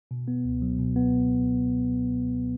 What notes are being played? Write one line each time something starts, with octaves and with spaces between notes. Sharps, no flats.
B2
B3
C#2
F#3
B2
B3